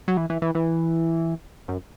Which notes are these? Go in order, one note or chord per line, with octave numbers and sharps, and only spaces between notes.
F#3
E3
E3
E3
E3
F#2